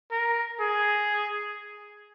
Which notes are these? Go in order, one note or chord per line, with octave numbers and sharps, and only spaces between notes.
A#4
G#4